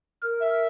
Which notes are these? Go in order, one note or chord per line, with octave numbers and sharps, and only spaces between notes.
A#4
E5